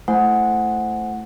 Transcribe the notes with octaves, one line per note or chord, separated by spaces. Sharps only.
A3 E4 C5 F#5 G#5